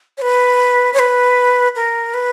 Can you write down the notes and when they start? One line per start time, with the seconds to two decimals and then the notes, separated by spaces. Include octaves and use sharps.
0.18 C#5
0.22 B4
0.94 C#5
0.99 B4
1.76 A#4
2.14 B4